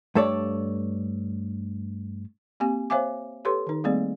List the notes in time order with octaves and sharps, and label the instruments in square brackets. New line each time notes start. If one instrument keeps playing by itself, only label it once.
[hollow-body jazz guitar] G2 A3 A4 C#5 D5
[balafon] A#3 C4 G4 G#5
C5 C#5 E5 F5 G#5 D6
G4 A4 B4 C#5 C6
D#3 D#4
G3 A3 A#3 C4 G#4 D5